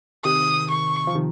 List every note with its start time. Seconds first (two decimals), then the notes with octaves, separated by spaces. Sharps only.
0.25 C3 D#3 D#6
0.70 C#6
1.07 F3
1.15 C3 D#3